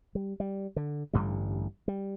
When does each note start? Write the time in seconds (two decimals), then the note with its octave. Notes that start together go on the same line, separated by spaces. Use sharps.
0.15 G3
0.40 G3
0.76 D3
1.13 A1 G2 D3 G3
1.88 G3